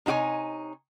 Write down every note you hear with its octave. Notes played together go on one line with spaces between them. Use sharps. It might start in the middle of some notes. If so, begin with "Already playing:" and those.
C3 D#4 F#4 C#5 G#5